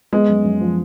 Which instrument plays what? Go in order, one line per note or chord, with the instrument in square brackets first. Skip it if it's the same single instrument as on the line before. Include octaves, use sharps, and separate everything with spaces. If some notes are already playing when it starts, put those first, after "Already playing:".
[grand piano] G#3 [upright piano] B3
[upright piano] F#2
F#2
F3